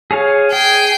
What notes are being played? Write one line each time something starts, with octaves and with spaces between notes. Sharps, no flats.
G#4 C#5 F5
G#4 G5 C7